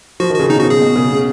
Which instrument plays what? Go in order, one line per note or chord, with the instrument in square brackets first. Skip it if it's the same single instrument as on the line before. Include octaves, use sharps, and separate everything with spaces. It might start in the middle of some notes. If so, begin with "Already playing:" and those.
[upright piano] F3 [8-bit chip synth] F#4
[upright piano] D#3
[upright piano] C#3 [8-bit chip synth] F#4
[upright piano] B2 [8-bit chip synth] D#4
[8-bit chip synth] F#4
[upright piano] C#3 [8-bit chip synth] G#4
[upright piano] B2
C#3
B2